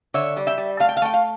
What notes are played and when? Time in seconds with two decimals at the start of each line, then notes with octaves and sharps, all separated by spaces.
0.14 D3 C#5 E5
0.37 G3
0.47 E5 G5
0.58 G3
0.80 A3 F5
0.89 G5
0.97 F5
1.02 A3 G5
1.14 F5